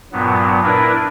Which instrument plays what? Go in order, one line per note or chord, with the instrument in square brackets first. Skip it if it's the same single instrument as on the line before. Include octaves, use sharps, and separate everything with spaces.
[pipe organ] G2 A#2 F#3 B3
D4 E4 A#4 B4